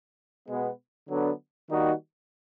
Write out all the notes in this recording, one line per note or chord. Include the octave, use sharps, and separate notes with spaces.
B2 G#3 B3
D3 F#3 B3 D4
D#3 G3 A#3 D#4 F#4